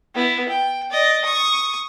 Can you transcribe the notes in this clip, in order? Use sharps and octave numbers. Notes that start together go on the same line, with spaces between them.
B3 E4
G5
D5 D#5
C#6 D#6